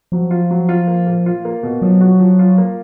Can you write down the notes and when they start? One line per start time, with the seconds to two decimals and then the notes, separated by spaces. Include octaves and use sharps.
0.12 F3 F#3
0.31 F4
0.51 F#3
0.69 F4
0.87 A#3
1.07 A#2
1.26 F4
1.45 A#3
1.63 B2
1.82 F3 F#3
2.01 F#4
2.19 F3
2.39 F4
2.58 A#3